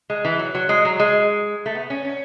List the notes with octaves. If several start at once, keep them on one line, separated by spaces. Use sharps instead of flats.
G#3
E3
F#3
F#3
G#3
F#3
G#3
A3
B3
C#4
C#4